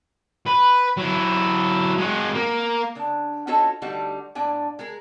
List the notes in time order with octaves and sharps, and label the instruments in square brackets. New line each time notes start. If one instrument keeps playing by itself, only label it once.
[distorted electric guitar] B4
F#3 E4
G#3 F#4
A#3
[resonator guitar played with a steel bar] C#3 D4
C#4 F4 F#4 A4 C#5 D#5
D3 G3 A3 D#4 F#4 F#5
A2 A#3 D4 D5 G#5
G#3 G#4 A#4